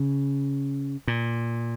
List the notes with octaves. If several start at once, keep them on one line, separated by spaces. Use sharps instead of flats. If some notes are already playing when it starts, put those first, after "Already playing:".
Already playing: C#3
A#2